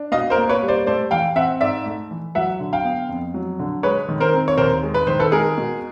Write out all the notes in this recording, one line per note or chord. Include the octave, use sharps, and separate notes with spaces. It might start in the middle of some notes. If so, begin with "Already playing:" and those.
Already playing: D4
B2 D#5 F5
A#4 C5
A#3
B4 C#5
G3
C5 D5
A3 C5 D5
E3 F5 G5
C4 E5 F#5
G#2 D5 E5
A3
E3
F#3 E5 F#5
D3
F5 G5
B3
F2
F#3
D3
G#3 B4 C#5
D#3
A#4 C5
C4
C#5
D#2 A#4 C5
G#3
B4
D#3 C5
A4 B4
G#3 G#4 A#4
B2